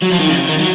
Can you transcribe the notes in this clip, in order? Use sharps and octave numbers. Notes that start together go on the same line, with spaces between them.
F#3
F3
D#3
C#3
D#3
F#3